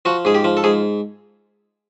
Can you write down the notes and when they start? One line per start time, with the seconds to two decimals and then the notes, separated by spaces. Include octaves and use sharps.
0.05 F3 F#4
0.25 G#2 G#4
0.35 G4
0.44 F3
0.57 A4
0.64 G#2 G#4